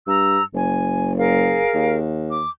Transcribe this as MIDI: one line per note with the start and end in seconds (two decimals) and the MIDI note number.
0.07 0.39 43
0.07 0.43 82
0.07 0.43 88
0.54 1.64 30
0.54 1.12 80
1.17 1.97 68
1.17 1.97 70
1.17 1.97 77
1.75 2.44 39
2.29 2.49 86